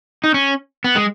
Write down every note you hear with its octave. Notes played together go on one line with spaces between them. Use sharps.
D#4
C#4
B3
G#3